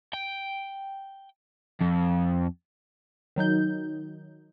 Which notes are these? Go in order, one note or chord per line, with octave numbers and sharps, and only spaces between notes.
G5
F2
D#3 F#3 D#4 G6